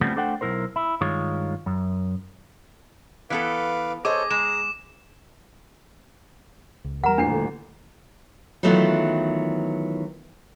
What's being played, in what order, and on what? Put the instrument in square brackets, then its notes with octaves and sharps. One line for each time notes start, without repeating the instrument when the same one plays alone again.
[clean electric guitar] C#3 F3 G3 A3 B3 C4
A3 D4 A4 C5 F#5 G5
B1 C#3 E4 A#4 C5
E4
G2 D#3 G#3 F4 C#5
F#2
[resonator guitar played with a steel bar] E3 B3 A4 [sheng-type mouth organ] B4 F5 D6
[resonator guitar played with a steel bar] G#4 D#5 [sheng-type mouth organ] A4 C5 C#5 [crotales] D6
[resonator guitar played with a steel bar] G#3 [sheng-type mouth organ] G#4 A#5 [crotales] E7
[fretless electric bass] C#2
[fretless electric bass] E2 G3 [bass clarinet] A#4 [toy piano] F#5 A#5
[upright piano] D#1 A1 C7 [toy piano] D4
[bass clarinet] D3
[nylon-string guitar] D#3 E3 F#3 A3 B3 F4